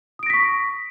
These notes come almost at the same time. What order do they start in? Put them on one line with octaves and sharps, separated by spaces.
D#6 D7 A#6 B6 C#6